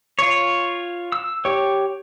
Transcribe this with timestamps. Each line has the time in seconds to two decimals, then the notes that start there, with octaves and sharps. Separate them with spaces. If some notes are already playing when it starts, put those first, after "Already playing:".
0.19 F4 C#5
1.12 E6
1.45 G4 C#5